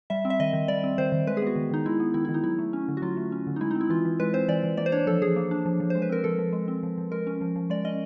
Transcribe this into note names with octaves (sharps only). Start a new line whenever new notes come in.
G3 E5
C4
E5
D#3 D#5
D#3
G3 D5
C4
D#3 C5
D#3
G#3 B4
G#4
B3 F#4
D#3
D#3 D#4
G#3 E4
B3
D#3 E4
E4
D#3
D#4
F#3 E4
A3
C#4
D3
F#4
F#3 F4
A3
C#4
D3
D#4
G#3 E4
D#4
C4
E4
E3 F4
E3
G#3 B4
C4 C5
E3 D5
E3
A#3 D5
C5
D4 C#5
F3 A4
F3 G#4
A#3
D4
F3
F3
G#3 C5
B4
C4 A#4
F3 A4
F3
G#3
C4
F3
F3
G#3 A#4
C#4
F3
F3
G#3 D5
C#4 D#5